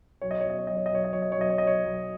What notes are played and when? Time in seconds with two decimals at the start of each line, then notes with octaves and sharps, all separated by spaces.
0.21 B1 C#5
0.31 D#5
0.41 C#5
0.45 B2 D#5
0.59 C#5
0.67 F#3 D#5
0.77 C#5
0.86 D#5
0.92 B1 C#5
1.04 D#5
1.13 F#3 C#5
1.22 D#5
1.32 C#5
1.38 B1 D#5
1.50 C#5
1.58 B1 D#5
1.67 C#5
1.85 B1